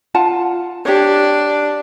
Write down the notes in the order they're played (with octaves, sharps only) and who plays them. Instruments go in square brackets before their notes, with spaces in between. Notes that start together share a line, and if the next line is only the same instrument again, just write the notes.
[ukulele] F4 F#5 A5
[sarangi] D4 [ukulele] G4 C#5